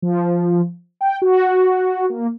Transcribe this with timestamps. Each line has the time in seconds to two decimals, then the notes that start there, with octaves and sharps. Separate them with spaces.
0.02 F3
1.01 G5
1.22 F#4
2.10 A#3